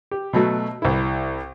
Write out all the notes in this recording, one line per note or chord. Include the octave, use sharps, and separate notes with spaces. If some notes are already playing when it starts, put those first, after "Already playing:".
G4
B2 F#3 A3
C2 E4